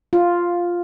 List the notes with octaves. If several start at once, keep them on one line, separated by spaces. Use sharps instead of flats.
F4